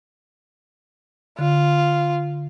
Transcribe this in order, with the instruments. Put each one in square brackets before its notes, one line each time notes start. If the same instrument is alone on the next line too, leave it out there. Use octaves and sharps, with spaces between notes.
[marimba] D3 [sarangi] F4